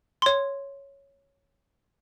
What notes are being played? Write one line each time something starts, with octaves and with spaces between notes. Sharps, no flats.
C#5 C6